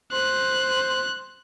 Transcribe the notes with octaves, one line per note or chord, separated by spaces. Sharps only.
C5 F#6